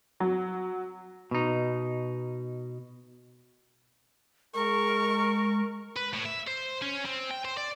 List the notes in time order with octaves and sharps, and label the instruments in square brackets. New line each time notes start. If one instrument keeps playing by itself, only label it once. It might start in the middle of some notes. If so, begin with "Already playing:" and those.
[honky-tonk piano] F#3
[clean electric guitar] B2 D#4
[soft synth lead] G#3 [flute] A#4 [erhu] C#6
[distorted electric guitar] B4
A2
E5
C5
C#4
C4
G5
C5
D5